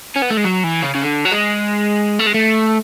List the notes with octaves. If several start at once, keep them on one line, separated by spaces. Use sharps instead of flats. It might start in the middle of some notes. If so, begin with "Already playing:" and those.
C#4
B3
A3
G#3
F#3
E3
C#3
C#3
D3
F#3
G#3
A3
G#3
A3